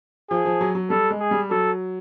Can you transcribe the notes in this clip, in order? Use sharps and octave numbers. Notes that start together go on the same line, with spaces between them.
F3 G#4
F3
F#3
F#3
G3 A4
G#3
G#4
G3
F#3 A4